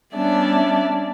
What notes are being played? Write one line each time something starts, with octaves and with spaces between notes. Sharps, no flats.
G3 B3 C#4 D4 D5 E5